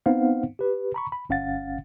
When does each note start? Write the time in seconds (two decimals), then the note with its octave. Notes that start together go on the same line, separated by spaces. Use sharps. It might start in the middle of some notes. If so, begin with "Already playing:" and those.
0.06 B3 C4 D#4 C5 F5 F#5
0.59 G4 B4
0.94 A#5 B5 C#6
1.12 B5
1.29 G1 C#4 F5 F#5 A6